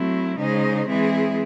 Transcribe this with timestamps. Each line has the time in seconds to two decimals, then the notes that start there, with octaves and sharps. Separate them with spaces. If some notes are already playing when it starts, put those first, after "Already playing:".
Already playing: F#3 A3 C4 E4
0.39 C#3 G#3 D#4 G#4 C5
0.89 E3 G#3 C4 E4 G#4